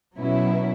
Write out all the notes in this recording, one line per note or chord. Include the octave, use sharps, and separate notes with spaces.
B2 F#3 C#4 E4